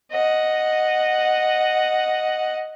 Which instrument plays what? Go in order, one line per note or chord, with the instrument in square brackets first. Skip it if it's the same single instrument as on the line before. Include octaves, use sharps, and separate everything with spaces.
[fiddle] D#5 F#5